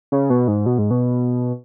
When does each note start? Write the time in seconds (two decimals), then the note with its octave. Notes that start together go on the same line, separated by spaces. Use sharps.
0.12 C#3
0.30 B2
0.48 G#2
0.66 B2
0.78 G#2
0.91 B2